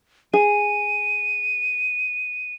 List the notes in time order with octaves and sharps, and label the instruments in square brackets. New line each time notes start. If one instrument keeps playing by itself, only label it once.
[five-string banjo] G#4 [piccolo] D#7